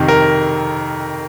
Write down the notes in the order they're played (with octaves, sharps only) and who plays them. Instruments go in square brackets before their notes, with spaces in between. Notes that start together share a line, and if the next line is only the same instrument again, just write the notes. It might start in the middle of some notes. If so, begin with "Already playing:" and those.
Already playing: [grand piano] F2 C3 D#3
A#4